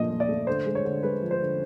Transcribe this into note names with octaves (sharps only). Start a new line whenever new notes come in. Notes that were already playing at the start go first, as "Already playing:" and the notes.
Already playing: A#2 F3 A3 D#5
A#2
D5
A3
D3 C5
G#3
C#5
D3
G#3 B4
F3
C5
D3